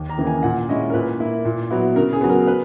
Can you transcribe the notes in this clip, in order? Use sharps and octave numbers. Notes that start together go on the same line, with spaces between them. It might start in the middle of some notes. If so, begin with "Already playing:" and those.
Already playing: D#2
A#5
C#3 E3 A#3
G#5
A#2 F#5
G#3 C#4 E4 D#5
A#4
A#2 B4
A#3 E4
A#2
F#3 B3 E4
C#3 A#4
G#4
F#3 B3
A#4
B4